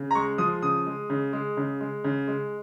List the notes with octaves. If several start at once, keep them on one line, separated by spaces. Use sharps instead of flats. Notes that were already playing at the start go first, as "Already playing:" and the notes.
Already playing: C#3
A#5
G#3 C#6
F3 D#6
C#3 D#6
G#3
C#3
G#3
C#3
G#3
C#3
G#3